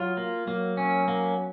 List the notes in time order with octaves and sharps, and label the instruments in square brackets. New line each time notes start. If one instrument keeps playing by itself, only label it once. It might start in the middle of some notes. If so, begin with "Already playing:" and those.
Already playing: [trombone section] F#3 [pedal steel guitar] F4
[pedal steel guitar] A#3
[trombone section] F#3 [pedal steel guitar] A#3
[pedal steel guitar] C#4
A#3